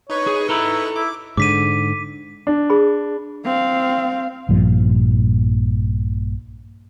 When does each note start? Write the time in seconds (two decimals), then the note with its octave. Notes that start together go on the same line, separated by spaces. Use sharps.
0.10 D#4 B4 C#5 C#6
0.27 G#4
0.49 E4 A4 A#5 B5
0.96 E4 D6
1.37 G#2 D3 D6 B6 D#7
2.47 D4
2.70 G#4 B5
3.44 C4 F5
4.49 A#1 G2 A#2 F3